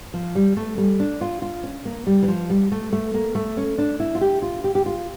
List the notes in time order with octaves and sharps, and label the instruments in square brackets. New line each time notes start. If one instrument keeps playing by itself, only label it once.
[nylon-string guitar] F3
G3
A3
G3
D4
F4
F4
C#4
A#3
G3
E3
F3
G3
A3
A3
A#3
A3
C#4
D4
E4
F4
G4
F4
G4
G4
F4